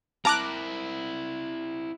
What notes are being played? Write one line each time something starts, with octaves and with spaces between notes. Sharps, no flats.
C4 E4 A#4 A5 A#5 D6 F#6